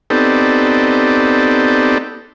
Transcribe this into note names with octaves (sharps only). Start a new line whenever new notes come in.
B3 C4 D#4 G4 A4 D5